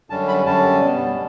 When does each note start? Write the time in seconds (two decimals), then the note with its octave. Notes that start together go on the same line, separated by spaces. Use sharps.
0.10 F#2 D3 G3 C#4 A5
0.28 B5
0.45 F#2 D3 G3 C#4 A5
0.80 B2 G3 B3